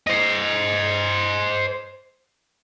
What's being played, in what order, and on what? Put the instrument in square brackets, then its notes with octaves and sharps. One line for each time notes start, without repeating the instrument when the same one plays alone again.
[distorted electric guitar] C5 D#5